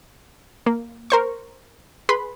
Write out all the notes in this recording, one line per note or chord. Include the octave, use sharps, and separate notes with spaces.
A#3
A#4 C5 C#6
G#4 B4 B5 C6